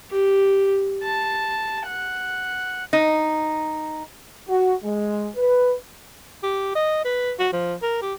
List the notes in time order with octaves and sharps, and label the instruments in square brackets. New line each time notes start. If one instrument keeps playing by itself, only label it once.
[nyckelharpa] G4
A5
F#5
[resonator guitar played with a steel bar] D#4
[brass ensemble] F#4
G#3
B4
[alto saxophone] G4
D#5
B4
F#4
F3
A#4
G4